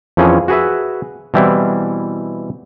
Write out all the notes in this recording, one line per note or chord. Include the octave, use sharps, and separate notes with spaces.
F2 E3 F3 C#4 G#4
F#4 G#4 B4 E5
B2 E3 G3 C4 E4